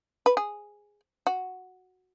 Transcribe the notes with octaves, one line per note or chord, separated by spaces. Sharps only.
B4
G#4
F#4